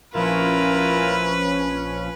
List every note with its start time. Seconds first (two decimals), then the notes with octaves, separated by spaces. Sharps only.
0.15 A#1 F3 C#4 E4 F4 A#4 B4